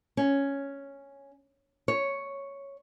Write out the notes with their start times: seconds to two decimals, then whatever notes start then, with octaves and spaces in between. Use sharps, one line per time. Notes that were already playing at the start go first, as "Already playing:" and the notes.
0.17 C#4
1.88 C#5